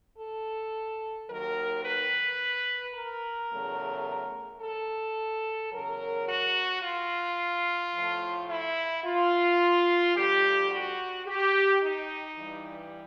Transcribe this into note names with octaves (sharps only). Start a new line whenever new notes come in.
A4
D#2 D#3 F#3 A#4
B4
A#4
E2 C#3 F#3 A3
A4
E2 C#3 F#3 A#4
F#4
F4
A2 F3 A3
E4
F4
F2 D3 G3 G4
F#4
G4
D#4
G2 E3 G3